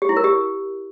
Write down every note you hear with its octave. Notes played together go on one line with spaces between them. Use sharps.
G4
E4
A#4
G4